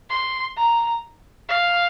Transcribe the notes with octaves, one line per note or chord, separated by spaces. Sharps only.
C6
A#5
F5